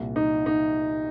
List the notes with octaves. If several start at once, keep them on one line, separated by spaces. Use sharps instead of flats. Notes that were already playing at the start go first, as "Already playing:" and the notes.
Already playing: C2 A#2
D#4
D#4